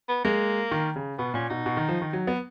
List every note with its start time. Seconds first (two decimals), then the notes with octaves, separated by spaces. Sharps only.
0.08 B3
0.24 G#3 A#3
0.71 D#3
0.96 C#3
1.18 B2 B3
1.34 A#2 C#4
1.49 B2 D#4
1.66 B2
1.77 D#3
1.89 F3
2.01 D#3
2.13 F#3
2.27 B3